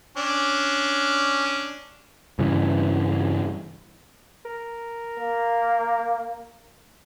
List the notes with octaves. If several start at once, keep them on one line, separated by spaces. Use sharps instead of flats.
C#4 D4
G2 C#3 E3
A#4
A#3